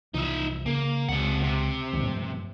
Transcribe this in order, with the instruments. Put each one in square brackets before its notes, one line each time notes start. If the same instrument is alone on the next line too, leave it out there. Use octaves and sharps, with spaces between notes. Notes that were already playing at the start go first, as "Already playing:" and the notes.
[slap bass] C2 E3 F3 [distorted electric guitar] D#4 E5
[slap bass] C#3 [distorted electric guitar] A#3
[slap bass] C#2 [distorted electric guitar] C3 F#5
[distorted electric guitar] C3
[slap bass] C#2 D#3 G3
G2 F3 A3